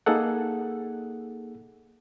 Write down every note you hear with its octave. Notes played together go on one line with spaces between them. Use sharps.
A#3 D#4 G#4 A4 F#5